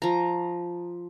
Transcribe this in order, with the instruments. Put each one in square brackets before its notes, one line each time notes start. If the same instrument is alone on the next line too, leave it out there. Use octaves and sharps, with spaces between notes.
[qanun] F3 A#5